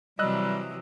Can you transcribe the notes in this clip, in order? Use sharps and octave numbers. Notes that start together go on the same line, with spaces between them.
C3 E3 F#3 G3 D#5 E6 F#6